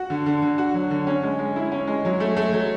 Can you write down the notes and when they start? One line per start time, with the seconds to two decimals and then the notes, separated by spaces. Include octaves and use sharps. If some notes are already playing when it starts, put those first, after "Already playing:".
Already playing: F#4
0.10 D3
0.26 D3
0.42 D3
0.58 F#4
0.74 F#3
0.91 D3
1.07 C#4
1.23 G#3
1.39 G#3
1.56 E4
1.72 C#4
1.87 G#3
2.05 F#3
2.20 A3
2.37 A3
2.53 F#3